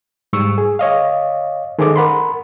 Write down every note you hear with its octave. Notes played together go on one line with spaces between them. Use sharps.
G#2 G3 C#6 E6
G#4
C#5 D#5 F5
D#3 G#4 A4 C5 D#5 D6
A#4 F#5 B5 C6